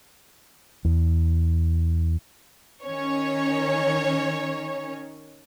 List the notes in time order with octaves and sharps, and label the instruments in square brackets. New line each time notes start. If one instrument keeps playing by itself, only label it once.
[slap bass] E2
[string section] D#3 C#4 C#5